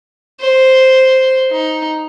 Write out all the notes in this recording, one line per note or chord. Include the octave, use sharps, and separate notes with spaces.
C5
D#4